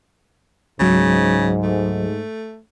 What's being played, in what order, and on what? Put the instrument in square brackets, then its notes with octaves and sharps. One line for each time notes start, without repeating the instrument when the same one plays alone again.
[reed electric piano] C#2 F#3 [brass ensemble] G#2 [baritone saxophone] C#3
[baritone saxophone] A3